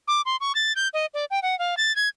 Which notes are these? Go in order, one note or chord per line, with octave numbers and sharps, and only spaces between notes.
D6
C6
C#6
A6
G6
D#5
D5
G5
F#5
F5
A6
G#6